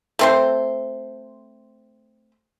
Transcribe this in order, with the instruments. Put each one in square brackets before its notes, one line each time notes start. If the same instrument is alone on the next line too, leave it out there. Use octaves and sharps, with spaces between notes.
[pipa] A3 C4 C5